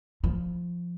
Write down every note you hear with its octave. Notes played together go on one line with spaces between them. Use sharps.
F3